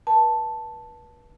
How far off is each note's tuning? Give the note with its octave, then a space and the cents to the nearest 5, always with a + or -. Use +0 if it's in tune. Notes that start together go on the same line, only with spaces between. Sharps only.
B4 -35 A5 +0